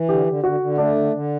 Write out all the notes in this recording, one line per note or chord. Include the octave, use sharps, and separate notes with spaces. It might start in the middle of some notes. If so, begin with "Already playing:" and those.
Already playing: E3
D3 G4
D3
D3 F#4
D3
A3 D4
D3
D3